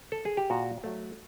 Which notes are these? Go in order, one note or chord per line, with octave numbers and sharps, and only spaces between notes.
A4
G#4
G4
A#2 F#4
F#3 A3